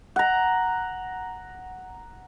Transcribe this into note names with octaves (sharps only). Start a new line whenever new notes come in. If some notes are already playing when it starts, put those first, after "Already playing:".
F#5 A#5